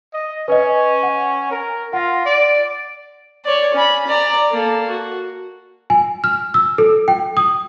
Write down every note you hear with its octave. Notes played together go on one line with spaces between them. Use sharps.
D#5
C#4 B4 D#5
F#5
A#4
F4 F#5 A#6
D5
C#5 D5
C#4 B5
D5 A#5
A#3 A4
F#4
G#5
F6
E6
A4
G5
D#6